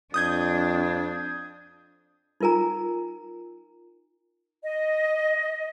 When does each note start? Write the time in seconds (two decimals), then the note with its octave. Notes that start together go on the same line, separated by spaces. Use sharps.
0.14 F2 D4 D#6 G6 G#6
2.40 D#4 F4 A#4 G#5 A#5
4.63 D#5